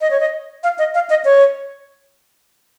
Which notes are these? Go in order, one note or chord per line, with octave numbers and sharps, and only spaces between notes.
D#5
C#5
D#5
F5
D#5
F5
D#5
C#5